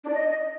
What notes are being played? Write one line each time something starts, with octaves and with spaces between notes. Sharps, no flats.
D4
D5
D#5